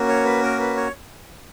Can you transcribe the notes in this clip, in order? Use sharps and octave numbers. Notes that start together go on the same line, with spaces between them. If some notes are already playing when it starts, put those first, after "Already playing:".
Already playing: A#3 C#4 F#4
C#5
B4
A#4
B4
C#5